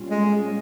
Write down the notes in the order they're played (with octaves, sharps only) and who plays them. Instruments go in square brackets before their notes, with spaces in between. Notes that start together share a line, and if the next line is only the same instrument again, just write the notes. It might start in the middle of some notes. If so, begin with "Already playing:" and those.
Already playing: [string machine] A#2 G3 C#4 F4
[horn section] G#3